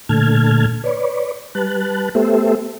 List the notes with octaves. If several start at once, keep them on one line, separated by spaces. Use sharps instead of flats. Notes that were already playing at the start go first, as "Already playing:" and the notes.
A#2 D3 A3 A5 F6 G#6
B4 C#5 D5
G3 B4 A5 F#6
A3 B3 G4 A4 C5 E5